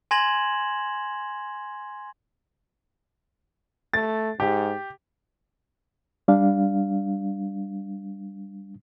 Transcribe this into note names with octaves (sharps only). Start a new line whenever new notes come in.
G#5 C6 G#6 A#6 E7 F#7
A3 A6
G#2 G4
G3 D4 F5